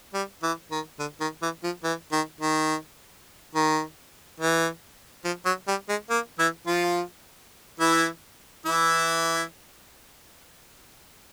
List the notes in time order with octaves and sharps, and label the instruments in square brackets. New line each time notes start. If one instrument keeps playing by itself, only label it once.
[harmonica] G3
E3
D#3
D3
D#3
E3
F3
E3
D#3
D#3
D#3
E3
F3
F#3
G3
G#3
A#3
E3 E4
F3 F4
E3 E4
E3 E4